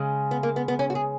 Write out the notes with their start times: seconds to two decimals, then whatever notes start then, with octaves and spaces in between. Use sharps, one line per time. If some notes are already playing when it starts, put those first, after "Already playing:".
Already playing: C#3 G#3
0.31 B3
0.43 A#3
0.56 B3
0.68 B3
0.79 C#4
0.90 F#4
0.95 G#4